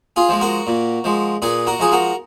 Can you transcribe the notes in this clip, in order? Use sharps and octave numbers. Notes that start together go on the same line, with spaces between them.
F4 G#4
F3 G#3
F#4 A#4
A#2
F3 G#3
A#2 G#4 B4
F#4 A#4
F3 G#3 G#4
F#4 A#4